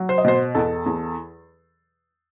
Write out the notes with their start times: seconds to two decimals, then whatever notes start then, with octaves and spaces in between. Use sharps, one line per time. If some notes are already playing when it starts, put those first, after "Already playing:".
Already playing: F#3
0.09 C5
0.18 D#5
0.24 B2 C5
0.55 E2 A4
0.86 E2